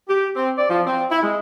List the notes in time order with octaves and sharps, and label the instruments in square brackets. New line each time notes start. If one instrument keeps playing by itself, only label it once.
[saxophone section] G4
C4
D5
F3
C4
E4
G#3